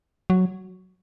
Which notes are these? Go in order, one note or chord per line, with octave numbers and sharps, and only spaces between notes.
F#3